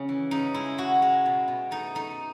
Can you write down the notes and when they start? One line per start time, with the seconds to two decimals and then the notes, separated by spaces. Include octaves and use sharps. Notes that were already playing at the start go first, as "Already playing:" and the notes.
Already playing: C#3 G#3 C#4
0.09 E3
0.31 C#3 D#4
0.54 G#3 E4
0.78 G#3 F#4
1.02 G#3
1.26 B2
1.48 B2
1.71 A3 D#4
1.95 A3 D#4